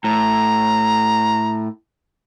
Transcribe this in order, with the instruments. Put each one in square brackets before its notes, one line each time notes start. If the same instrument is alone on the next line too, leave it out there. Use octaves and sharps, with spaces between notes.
[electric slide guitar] A2 [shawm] A#5